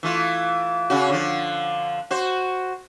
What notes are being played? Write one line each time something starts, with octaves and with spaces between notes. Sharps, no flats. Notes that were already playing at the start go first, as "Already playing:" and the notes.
E3 A3 F4
C#3 C#4 F#4
D3 F3
F#4 C5